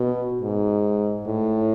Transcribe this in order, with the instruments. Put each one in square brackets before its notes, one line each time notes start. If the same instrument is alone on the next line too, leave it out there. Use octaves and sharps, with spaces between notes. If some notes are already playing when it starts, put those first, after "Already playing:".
Already playing: [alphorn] B2
G#2
A2